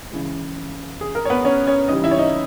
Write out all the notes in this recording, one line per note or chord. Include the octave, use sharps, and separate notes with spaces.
C#3 E3 G#3
G#4
A#4
C#5
B3 B4
C#4 C#5
C#4 C#5
C#3 E3 G3 D#4 D#5
E4 E5
C#5
D#4 D#5